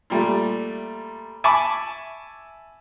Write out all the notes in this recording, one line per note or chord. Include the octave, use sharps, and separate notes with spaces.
A#2 G3 A3
E5 G#5 A5 B5 C#6 D6